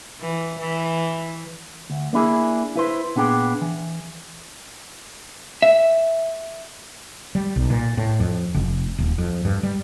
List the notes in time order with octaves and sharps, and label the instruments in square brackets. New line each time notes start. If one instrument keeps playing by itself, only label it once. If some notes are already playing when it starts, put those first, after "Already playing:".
[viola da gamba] E3
E3
[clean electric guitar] D2
A#3 D4 E4 G#4
E4 B4 C5
A#2 B3 D4 G#4 G5
E3
[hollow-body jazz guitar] E5
[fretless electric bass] G3
B1
A#2
A2
F2
F1
D#1
F2
G2
G3